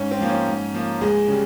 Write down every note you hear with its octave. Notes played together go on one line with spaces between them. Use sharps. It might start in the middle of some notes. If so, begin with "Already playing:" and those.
Already playing: G#2 C#4
C4
F3 A#3
C#4
G#2
F3 A#3
C#2 G#3 G#4
C#3 G3